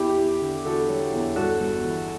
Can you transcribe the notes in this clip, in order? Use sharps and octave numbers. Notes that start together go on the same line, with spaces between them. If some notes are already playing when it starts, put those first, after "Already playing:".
Already playing: E2 E4 G4
E2
D3
E2 F#4 A4
F#3
E2
G2 F#4 A4
G1
E3